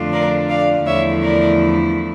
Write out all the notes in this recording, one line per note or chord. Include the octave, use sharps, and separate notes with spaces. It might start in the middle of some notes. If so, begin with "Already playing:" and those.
Already playing: F2 D3 A3 D4 F4
A#4 D5
D5 F5
E2 D3 F3 A3 E4 C#5 E5
A#4 D5